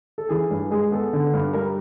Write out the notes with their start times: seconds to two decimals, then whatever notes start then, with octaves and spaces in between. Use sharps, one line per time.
0.18 A4
0.29 E3 G#4
0.51 G2
0.71 G#3 G#4
0.92 B3 A4
1.13 D3
1.33 G2
1.53 G3 A#4